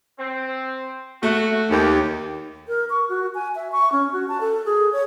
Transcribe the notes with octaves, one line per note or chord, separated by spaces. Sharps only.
C4
A3 F#4
D#2 G4
A#4
C#6
F#4
G#5
E5
C#6
C#4
F#4
A5
A4
G#4
C#5